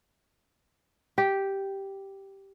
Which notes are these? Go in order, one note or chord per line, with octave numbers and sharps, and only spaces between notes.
G4